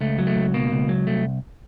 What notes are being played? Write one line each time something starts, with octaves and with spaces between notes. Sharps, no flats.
C#2 A3
F#3
A3
C#2
B2 A#3
C#2
F#3
C2 A3